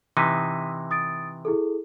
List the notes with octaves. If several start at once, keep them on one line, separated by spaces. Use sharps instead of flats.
C3 E3 D#4 D#6 B6 D#7
D#6 A6 D7
E4 G#4 A4